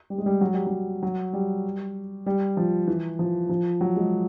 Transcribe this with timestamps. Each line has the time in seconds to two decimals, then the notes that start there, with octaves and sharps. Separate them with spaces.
0.10 G3
0.18 G#3
0.26 G3
0.41 F#3
0.54 G3
0.67 F#3
1.03 F#3
1.33 G3
2.26 G3
2.57 F3
2.88 E3
3.19 F3
3.49 F3
3.81 F#3
3.96 G#3